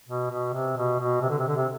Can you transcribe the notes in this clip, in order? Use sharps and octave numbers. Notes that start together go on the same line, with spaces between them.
B2
B2
C3
B2
B2
C3
D3
C3
D3
C3